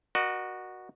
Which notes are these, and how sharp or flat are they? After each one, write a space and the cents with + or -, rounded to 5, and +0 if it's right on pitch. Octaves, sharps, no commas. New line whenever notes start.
F#4 +0 A#4 +35 D#5 -45